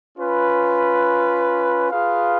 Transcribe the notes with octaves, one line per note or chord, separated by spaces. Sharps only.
C#4 F4 B4
F4 G#4 B4 F5